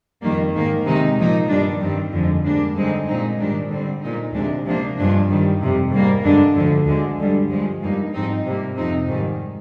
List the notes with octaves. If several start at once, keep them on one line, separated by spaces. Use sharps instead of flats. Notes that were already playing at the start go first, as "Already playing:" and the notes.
F2 D#3 G3 A#3
G#2 D#3 A#3
C3 D#3 G#3 D#4
A#2 F3 A#3 D#4
G2 D#3 G3 D4
G2 D#3 G3 C4
F2 D3 F3 G#3
G#2 G3 A#3 D4
G2 D3 G#3 C4 D#4
A#2 G#3 C4 D#4
G#2 D#3 G3 D4
D3 G3 C4
A#2 G#3 D#4
D2 C3 F3 G#3 D4
C3 F3 A#3 D4
G2 F3 G#3 D4
G2 D#3 G3
F2 C3 G3
G#2 G3 A#3
G2 D3 G#3 D4
D2 D3 F3
D2 D3 G#3
G2 D3 G3
G2 F3 G#3
G2 F3 A#3 D#4
G#2 F3 C4 D#4
C3 G3 A#3
F2 C3 F3 C4 D#4
G#2 D#3 G3